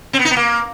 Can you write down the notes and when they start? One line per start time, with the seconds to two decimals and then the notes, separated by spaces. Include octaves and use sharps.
0.13 C4
0.19 B3
0.25 D#4
0.31 B3
0.36 A#3